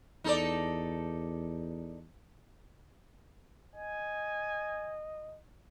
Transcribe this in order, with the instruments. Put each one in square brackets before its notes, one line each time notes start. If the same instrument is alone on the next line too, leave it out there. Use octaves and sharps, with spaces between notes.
[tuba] E2 [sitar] D#4 A4 D5
[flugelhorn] D#5 [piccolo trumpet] G#5